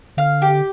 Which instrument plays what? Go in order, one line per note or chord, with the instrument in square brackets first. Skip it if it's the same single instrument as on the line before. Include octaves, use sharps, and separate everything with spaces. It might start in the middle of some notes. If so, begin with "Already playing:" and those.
[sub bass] D3 [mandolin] F5
[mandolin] G4